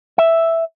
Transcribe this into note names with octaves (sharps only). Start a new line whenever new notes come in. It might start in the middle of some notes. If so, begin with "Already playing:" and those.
E5